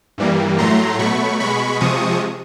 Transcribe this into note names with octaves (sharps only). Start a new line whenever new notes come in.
G2 E3 G3 A#3
A2 F#3 A3 A#5 C6
B2 F#3 A3 B5 C#6
B2 G#3 B5 C#6
C3 F3 G#3 C#6 D#6